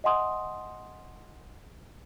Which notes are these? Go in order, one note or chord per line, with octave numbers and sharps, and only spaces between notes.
D#5 E5 F#5 G#5 C6 D#6